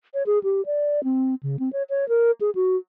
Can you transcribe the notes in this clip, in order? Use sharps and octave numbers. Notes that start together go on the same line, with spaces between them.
C#5
G#4
G4
D5
C4
C#3
C4
C#5
C#5
A#4
G#4
F#4